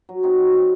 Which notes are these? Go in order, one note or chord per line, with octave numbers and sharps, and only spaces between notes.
F#3
C4 D#4 F#4
F#3
C4 D#4 F#4